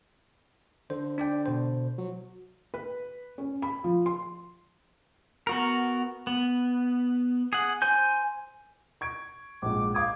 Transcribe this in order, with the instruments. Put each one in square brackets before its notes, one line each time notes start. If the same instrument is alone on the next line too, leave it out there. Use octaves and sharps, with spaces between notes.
[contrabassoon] D3 [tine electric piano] C5
[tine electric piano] D4 D5 G5
B2 C5
[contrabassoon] F#3
[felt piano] B4
C#4
B5
F3
C6
[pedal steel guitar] B3 F#4 A#4
B3
G#4 F#5
C5 G#5 G6
[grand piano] C#6 G#6 D7
[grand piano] A#1 G#2 [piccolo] D6
[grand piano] F5 D6 D#6 [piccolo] G#6